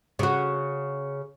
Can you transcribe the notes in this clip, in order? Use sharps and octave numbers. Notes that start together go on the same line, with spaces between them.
C#3 F#4